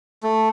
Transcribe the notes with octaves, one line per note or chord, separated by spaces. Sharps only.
A3